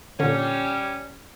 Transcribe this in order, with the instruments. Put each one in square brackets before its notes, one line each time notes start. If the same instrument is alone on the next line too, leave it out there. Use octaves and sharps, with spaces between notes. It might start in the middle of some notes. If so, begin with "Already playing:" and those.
[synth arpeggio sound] A#2 D3 [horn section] G3 C#4